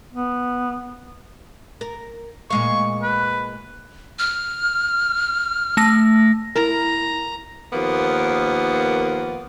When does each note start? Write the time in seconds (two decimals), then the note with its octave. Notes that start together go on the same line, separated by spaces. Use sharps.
0.12 B3
1.81 A#4
2.50 A#2 G#3 F5 C#6
3.03 B4
4.19 F6
5.77 A3 A#6
6.56 E4 A#4 A#5
7.72 D#2 F3 A#3 B3